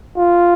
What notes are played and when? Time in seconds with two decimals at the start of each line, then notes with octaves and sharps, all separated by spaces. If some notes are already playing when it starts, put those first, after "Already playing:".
0.16 F4